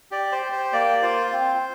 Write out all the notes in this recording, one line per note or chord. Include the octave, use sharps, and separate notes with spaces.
G4 D5
C5
G4
C5
A#3 D5
F4 C5
C4